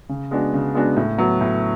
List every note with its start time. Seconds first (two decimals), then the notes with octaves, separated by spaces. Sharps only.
0.09 C#3
0.31 G#3 B3 D4 F#4
0.54 C#3
0.74 G#3 B3 D4 F#4
0.97 A2
1.18 F#3 B3
1.41 A2